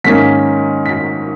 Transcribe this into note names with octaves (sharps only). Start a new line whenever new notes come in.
G#2 D#3 A#3 C#4 B6
B6